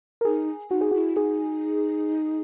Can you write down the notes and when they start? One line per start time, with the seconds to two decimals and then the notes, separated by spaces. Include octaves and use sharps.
0.21 A#4
0.25 D#4 G#4
0.71 D#4 F#4
0.81 G#4
0.91 E4 F#4
1.17 D#4 G#4